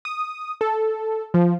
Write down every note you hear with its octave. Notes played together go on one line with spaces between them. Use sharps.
D#6
A4
F3